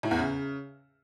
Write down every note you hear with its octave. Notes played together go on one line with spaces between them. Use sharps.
A2
E2
C#3